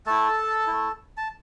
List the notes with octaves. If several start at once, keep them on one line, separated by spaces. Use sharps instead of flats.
A3 E4 A4 A5
A3 E4
A5